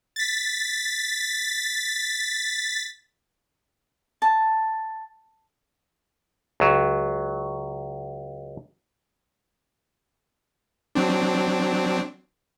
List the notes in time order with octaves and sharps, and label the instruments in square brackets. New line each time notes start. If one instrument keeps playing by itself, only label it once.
[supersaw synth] A6 B6
[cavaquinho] A5
[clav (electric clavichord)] C#2 F#3
[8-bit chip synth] F#3 C4 D4